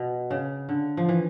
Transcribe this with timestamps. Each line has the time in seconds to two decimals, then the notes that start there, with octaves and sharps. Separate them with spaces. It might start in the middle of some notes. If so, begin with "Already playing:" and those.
Already playing: B2
0.31 C#3
0.69 D3
0.97 F3
1.09 E3